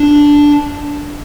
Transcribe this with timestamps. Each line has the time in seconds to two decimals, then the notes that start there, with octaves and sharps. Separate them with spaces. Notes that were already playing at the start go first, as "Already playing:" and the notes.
Already playing: D4